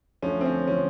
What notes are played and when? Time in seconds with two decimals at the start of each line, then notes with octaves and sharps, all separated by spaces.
0.23 D2 D3 F3 C#4
0.41 C4
0.45 C#4
0.68 D3 F3 C#4